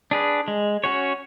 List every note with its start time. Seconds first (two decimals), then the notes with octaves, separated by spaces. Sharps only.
0.11 D4 G#4 B4
0.48 G#3
0.84 C#4 F#4 C#5